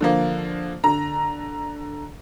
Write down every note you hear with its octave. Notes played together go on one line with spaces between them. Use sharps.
D3 F3 A#3
D3 A#5